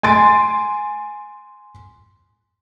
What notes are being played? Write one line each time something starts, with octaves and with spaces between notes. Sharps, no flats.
G#5 C6 A6 D7